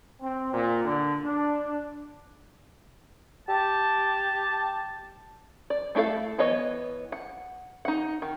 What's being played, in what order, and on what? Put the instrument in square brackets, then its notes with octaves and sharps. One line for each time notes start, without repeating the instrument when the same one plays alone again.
[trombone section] C4
A#2
D3
D4
[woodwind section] G4 A5
[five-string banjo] D5
A3 D4 E4 A4 F5
E3 B3 C#5 D#5
F#5
D#4 F#5
D#3